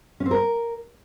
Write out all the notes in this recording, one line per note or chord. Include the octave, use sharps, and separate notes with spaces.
C#4
C4
A#4